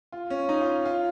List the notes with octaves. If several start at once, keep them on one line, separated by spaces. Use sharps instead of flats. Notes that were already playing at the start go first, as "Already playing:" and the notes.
F4
C#4
D#4
F4
F4